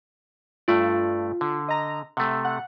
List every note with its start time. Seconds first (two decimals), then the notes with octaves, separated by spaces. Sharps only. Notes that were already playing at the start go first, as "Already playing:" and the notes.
0.68 G2 A3 F4 D5
1.41 D3
1.68 D#5 A#5
2.17 C3 A3 F#5
2.45 F#5